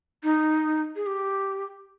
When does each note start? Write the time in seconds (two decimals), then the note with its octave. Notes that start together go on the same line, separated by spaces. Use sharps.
0.23 D#4
0.96 G#4
1.06 G4